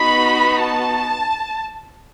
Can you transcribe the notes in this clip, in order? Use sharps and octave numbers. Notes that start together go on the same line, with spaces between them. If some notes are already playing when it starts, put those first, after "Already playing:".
Already playing: B3 D#4 F#4 B5
A5